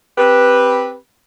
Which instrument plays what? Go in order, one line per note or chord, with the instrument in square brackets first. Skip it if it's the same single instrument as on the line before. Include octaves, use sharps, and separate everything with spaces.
[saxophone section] C4 G4 B4